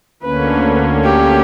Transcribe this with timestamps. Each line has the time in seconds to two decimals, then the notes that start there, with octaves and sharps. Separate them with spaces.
0.23 D2 D3 A#3 C#4 B4
1.04 G4